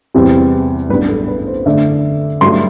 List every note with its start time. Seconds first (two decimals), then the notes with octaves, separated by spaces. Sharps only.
0.14 E2 C3 G3 C4
0.89 A1 G2 F#3 B3 D4 B4
1.09 A4
1.28 B4
1.47 C5
1.66 F#2 D3 A3 D4 E5
2.41 G2 F#3 A3 C6